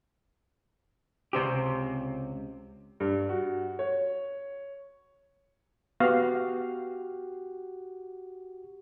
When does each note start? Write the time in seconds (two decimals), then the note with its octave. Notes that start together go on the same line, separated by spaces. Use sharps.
1.33 C#2 C3 C4 G4
3.00 G2
3.29 F#4
3.79 C#5
6.00 B3 F#4 G4 F5